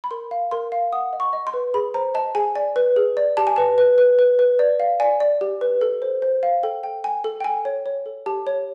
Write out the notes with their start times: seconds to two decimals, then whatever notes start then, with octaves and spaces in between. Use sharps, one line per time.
0.04 B5
0.11 A#4 C6
0.31 F5
0.51 A#4 C6
0.72 F5
0.93 F#5 D#6
1.13 D#5
1.20 C#6
1.33 D#5
1.47 C6
1.54 B4
1.74 G#4 B5
1.94 C5 A#5
2.14 D#5 A5
2.35 G#4 G#5
2.56 D5 G#5
2.76 B4
2.96 G#4
3.17 D5
3.37 G4 A5
3.47 G#5
3.56 B4 A5
3.78 B4
3.98 B4
4.19 B4
4.39 B4
4.59 D5
4.80 F5
5.00 D5 G#5
5.20 D5
5.41 G4
5.61 B4
5.81 A4
6.02 C5
6.22 C5
6.43 F5
6.63 A4 G5
6.83 G5
7.04 G5 G#5
7.24 A4
7.40 G5
7.44 A4 G#5
7.65 C#5
7.86 C#5
8.06 A4
8.26 G4 A5
8.47 C#5